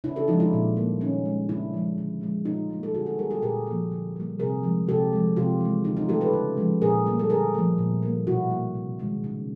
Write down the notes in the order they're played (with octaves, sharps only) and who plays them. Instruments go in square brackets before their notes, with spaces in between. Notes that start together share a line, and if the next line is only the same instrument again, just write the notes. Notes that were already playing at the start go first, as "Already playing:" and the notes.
[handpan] C#3 D4 E4
G4 A4
F3 D#4 F4
G#3
D4 E4
A#2
G3 A#3
D#3 C#4 D#4
G#3
C#3 D4 E4
F3 G#3
D3
F3 G#3
A#2 D#4 F4
G3 A#3
A4
D3 F#4 G#4
G4 A4
G3 A#3 G#4 A#4
G4 A4
A#2 G#4 A#4
F3 A#3
D3
G3 A#3
C3 G#4 A#4
F3 G#3
C3 G4 A4
F3 G#3
C3 F4 G4
E3 G#3
D3 D#4 F4
D#4 F4
F#3 A3 G4 A4
A4 B4
C#3
F3 G#3
A#2 G#4 A#4
G3 A#3
A4
D3 G#4 A#4
F3 A3
A#2
G3 A#3
B2 E4 F#4
G3 A#3
C3
D#3 G#3
C#3